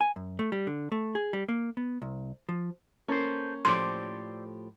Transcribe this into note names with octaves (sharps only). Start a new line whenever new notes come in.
G#5
F#2
A3
G3
D3
A3
G#4
G3
A#3
B3
C2
F3
A#3 C#4 A4 C5
A2 F3 G4 A4 C5 D5 C6